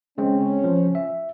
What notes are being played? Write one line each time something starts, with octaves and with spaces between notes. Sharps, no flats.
C#3 G#3 C4 C#4
F3
E5